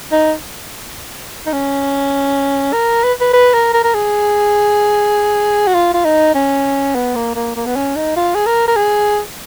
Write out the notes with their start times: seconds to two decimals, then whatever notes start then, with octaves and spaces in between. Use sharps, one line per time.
0.12 D#4
1.46 D#4
1.53 C#4
2.73 A#4
3.04 B4
3.21 B4
3.33 B4
3.54 A#4
3.74 A#4
3.84 A#4
3.94 G#4
5.67 F#4
5.75 F4
5.94 F4
6.05 D#4
6.35 C#4
6.95 B3
7.16 A#3
7.35 A#3
7.56 A#3
7.66 B3
7.76 C#4
7.96 D#4
8.16 F4
8.35 G#4
8.46 A#4
8.68 A#4
8.76 G#4